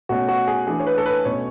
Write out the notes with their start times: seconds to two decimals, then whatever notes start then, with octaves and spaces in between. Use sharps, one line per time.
0.09 B2 A3 C#4 F#4
0.29 F#4
0.47 G#4
0.67 E3 A3 D4 G#4
0.80 C#5
0.87 B4
0.98 A4
1.06 B4
1.25 B2 A3 C#4 C#5